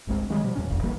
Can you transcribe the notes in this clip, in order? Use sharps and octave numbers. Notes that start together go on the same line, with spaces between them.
G1 C2 G#3 C4
D#3 G3 G#3
B2 F3 G3
D#2 A2 C#4
E1 A1 F2
A1 E3 G3 A#3